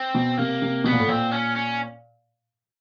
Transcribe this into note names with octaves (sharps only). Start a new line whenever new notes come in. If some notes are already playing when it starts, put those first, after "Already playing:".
Already playing: C4
B2
C3 A#3
C3
B2 B3
A#2
A2
A#2 C4
C#4
C#4